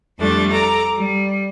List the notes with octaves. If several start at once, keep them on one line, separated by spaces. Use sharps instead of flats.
F2 G3 A3 D4 A6
A4 A#5 D6
G3